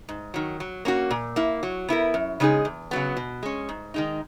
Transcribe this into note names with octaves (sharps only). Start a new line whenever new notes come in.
G#2
D#3 F#3
F#3
A#3 C#4 F#4
A#2
A#3 E4
F#3
B3 E4 A#4
F#2
C#3 G#3 D#4 G#4
E2
C#3 F#3 B3
B2
G#3 C#4
G#2
D#3 G#3 D#4